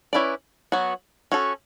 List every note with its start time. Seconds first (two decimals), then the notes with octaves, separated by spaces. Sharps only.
0.13 C#4 E4 B4 D5
0.72 F#3 B3 F#4
1.32 C#4 F#4 A4